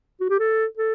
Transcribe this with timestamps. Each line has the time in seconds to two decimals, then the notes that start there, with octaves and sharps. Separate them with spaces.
0.20 F#4
0.30 G4
0.39 A4
0.77 A4